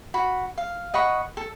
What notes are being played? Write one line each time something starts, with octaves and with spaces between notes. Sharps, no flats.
F#4 B5
F5
D#5 F#5 B5 C#6
A4